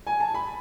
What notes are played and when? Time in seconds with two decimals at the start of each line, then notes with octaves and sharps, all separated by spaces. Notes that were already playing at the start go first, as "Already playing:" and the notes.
0.07 G#5
0.20 A5
0.34 B5